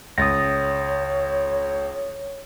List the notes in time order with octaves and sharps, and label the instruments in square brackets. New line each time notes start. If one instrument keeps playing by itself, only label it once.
[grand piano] C#2 [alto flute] C#5 [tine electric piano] D#6 A6 A#6